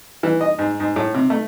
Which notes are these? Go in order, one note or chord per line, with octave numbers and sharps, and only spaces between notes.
E3
D#5
G#2
G#2
A2
C3
A3